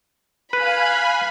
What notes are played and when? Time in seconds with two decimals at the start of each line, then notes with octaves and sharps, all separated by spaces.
0.53 B4 F5 G#5 B5 F#6